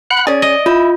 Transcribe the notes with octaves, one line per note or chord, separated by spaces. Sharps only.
F#5 B5 F#6
C#4 G#4 D5
D#5
E4 F4